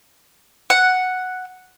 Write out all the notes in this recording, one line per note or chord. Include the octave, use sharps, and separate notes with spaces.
F#5